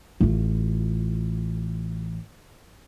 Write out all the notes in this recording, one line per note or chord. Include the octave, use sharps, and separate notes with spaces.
A1 F4